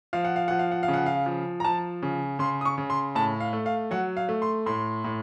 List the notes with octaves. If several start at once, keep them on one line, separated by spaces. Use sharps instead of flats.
F3 F5
F#5
F5
F3 F#5
F5
F#5
F5
C#3
F#5
F5
F3
A#5
F3 A5
C#3
C#3 C6
D#6
C#6
C#3
C6
A2 A5
F5
A3
F5
F#3 F#5
F5
A3
C6
A2 C6
A2